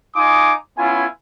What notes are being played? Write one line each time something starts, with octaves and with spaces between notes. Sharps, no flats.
D#4 F4 G#5 C6 D6 D#6
B3 C#4 E4 F4 G#5